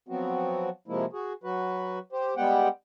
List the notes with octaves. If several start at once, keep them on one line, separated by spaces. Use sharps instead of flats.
F3 F#3 B3 C4 F#4
C3 F3 G#3 A#3 E4
F#4 G#4
F#3 F#4 B4
G4 C5
G3 G#3 B3 G4 F#5 G5